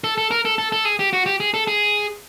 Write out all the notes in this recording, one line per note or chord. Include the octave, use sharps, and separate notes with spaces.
A4
A4
A#4
A4
A4
A4
G#4
G4
F#4
G4
G#4
A4
G#4